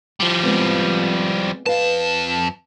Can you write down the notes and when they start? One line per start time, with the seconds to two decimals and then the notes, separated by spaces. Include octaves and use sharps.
0.20 F3 G3
0.43 G#3 B3 C4
1.66 F2 B4 D#5 F5 A5